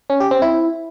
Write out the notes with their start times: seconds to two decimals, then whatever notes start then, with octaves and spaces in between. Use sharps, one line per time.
0.10 C#4
0.20 G4
0.31 C4
0.42 E4